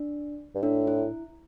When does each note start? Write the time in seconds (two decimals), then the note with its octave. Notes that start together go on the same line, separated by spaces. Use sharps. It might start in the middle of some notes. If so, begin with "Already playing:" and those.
Already playing: D4
0.55 G2
0.62 A2 D4
0.87 E4